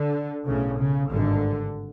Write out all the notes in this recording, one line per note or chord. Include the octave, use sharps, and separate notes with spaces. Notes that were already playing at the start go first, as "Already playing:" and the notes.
Already playing: D3
B1 A2 C#3
C#3
G#1 G2 D3